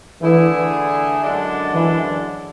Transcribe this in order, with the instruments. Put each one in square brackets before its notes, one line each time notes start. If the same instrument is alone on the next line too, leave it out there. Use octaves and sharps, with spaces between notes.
[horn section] D3 A3 E4 G#4 [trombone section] E3
[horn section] F#2 D3 G#3 D4
[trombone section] E3